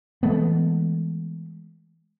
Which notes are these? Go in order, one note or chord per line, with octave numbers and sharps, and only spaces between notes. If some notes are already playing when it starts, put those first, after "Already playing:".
E3 G#3 A3 B3